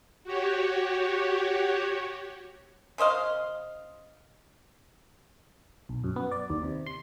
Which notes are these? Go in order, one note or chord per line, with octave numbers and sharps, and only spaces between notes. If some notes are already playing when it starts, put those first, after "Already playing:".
F#4 G4 C#5
C#3 C5 D#5 F5
B1
F#2
B3
D5
D#2
C3
C6